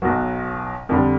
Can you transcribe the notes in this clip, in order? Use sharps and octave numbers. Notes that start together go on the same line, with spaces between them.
B1 B2 F#3 F#4
F2 D3 G3